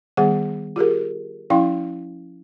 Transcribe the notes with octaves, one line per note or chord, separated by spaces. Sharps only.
D#3 G3 B3 G#4 F#5
F4 G4 G#4 A#4
F3 C#4 E4 F5 G5 C6